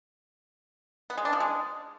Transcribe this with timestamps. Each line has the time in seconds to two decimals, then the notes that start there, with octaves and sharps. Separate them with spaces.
1.10 B3
1.18 G#3
1.25 D4
1.33 F3
1.40 G#3